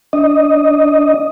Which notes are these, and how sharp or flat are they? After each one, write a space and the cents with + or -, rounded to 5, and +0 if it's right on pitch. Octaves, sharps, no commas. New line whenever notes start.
D4 -25 D#5 +0